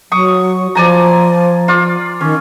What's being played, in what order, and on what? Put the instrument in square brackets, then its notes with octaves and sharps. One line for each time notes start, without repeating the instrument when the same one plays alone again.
[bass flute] F#3 [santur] C#6 D#6
[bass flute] F3 [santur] D5 G#5 A#5
[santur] F4 D5
[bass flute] D#3 [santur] C#4